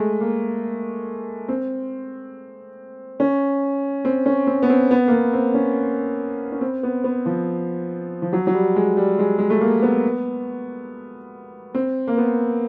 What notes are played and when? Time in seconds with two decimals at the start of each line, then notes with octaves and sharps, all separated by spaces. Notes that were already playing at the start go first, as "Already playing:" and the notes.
Already playing: G#3 A3
0.20 A#3
1.49 C4
3.20 C#4
4.05 C4
4.26 C#4
4.47 C4
4.63 B3
4.70 C4
4.91 B3
5.08 A#3
5.12 B3
5.33 C4
5.54 C#4
6.52 C#4
6.61 C4
6.83 B3
7.04 B3
7.26 F3
8.22 F3
8.33 F#3
8.47 F#3
8.53 G3
8.76 G#3
8.97 G3
9.19 G#3
9.39 G#3
9.50 A3
9.61 A#3
9.82 B3
11.75 C4
12.08 A#3
12.18 B3